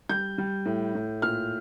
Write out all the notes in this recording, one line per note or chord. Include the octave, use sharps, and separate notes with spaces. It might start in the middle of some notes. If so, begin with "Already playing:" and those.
G3 G6
G3
A2
A2
A#2 F6